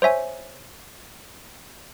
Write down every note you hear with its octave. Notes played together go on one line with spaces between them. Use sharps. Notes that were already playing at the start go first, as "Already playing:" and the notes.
C5 C#5 E5 G#5